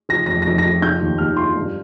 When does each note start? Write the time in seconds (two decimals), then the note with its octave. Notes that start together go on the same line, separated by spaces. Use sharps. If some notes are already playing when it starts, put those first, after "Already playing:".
0.09 F3 A#6
0.26 F2 A#6
0.42 A#6
0.46 F2
0.58 A#6
0.65 F2
0.82 F4 G6
1.01 D#2
1.18 D#2 F6
1.37 F4 C6
1.56 G2